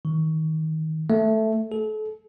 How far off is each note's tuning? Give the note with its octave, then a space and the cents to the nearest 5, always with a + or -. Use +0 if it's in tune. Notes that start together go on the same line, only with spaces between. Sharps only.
D#3 +25
A3 +0
A4 -35